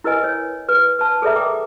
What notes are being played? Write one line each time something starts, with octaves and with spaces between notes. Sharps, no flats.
E4 A#4 B4 D#5 G#5
C#5
B4
B4 A5
G#4 A4 B4 D5 E5 A#5
A#4 G5 A#5 D6